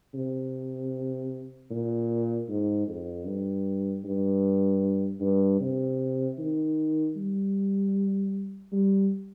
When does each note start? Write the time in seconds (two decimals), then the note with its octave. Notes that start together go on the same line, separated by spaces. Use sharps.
0.14 C3
1.71 A#2
2.49 G#2
2.88 F2
3.26 G2
4.04 G2
5.20 G2
5.60 C3
6.38 D#3
7.16 G3
8.72 G3